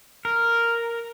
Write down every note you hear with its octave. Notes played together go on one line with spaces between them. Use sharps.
A#4